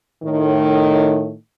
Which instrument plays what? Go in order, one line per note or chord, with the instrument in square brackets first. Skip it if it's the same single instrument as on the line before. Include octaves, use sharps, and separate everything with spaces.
[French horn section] A2 D#3